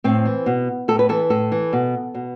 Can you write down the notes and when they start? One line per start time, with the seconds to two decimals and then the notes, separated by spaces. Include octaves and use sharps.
0.04 A2 C4
0.25 E3
0.46 B2
0.88 A2 A4
0.99 B4
1.09 E3 A4
1.30 A2 A4
1.52 E3
1.73 B2
2.15 B2